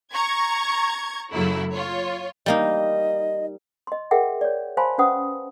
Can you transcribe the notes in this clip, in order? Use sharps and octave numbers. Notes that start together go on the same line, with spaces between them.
A#5 C#6 G#6
F#2 C#3 F#3 A3 A#3 E4
F4 C#5
G3 A#3 D#4 D#5
D#5 C6
G#4 A#4 E5 F#5 G5
C#5 D5
C5 F5 G#5 A5 B5 C6
C#4 B4 C5 F#5 D#6